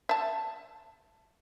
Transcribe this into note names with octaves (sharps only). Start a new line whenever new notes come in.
E5 A5